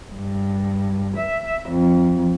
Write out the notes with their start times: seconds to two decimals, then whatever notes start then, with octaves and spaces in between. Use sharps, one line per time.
0.15 G2
1.15 E5
1.67 F2